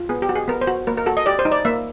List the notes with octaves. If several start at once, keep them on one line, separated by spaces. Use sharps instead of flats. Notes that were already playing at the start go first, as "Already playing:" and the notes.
Already playing: F4
B3 G#4
G4
F#4
G#4
B3 A#4
C5
F#4
A#3 A#4
A#4
F#4 A4
D#5
G4 D5
C5
D#4
D5
A#3 E5